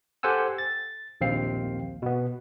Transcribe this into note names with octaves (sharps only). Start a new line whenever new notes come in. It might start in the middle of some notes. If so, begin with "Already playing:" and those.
G4 A4 C5 F#5 G#5 E6
A6
A#1 D#2 C4 F5 C7
B2 B3